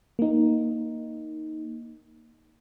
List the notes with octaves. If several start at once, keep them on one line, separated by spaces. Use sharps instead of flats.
A#3 D#4